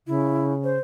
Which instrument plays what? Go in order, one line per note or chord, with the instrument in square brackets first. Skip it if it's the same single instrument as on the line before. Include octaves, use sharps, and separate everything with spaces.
[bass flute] C#3 [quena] E4
[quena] C5